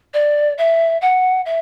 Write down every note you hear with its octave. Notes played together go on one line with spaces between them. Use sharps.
D5
E5
F#5
E5